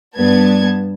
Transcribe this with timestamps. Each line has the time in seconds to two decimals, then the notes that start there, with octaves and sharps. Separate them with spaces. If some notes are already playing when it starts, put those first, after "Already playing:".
0.16 G2 B3 A5 G#6